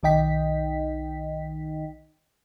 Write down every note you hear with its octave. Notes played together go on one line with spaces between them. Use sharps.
B1 D#3 D#4 D#5 G5 B6